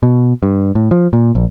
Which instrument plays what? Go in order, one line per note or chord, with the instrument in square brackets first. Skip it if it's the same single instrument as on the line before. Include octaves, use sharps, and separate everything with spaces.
[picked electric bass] B2
G2
A2
F3
A#2
A#1